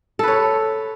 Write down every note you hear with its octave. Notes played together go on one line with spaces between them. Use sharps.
A4 B4 C#5